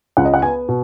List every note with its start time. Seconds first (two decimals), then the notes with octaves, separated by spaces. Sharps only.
0.17 C#2 F#5
0.25 D#5
0.34 F#5
0.42 B3 G#5
0.69 B2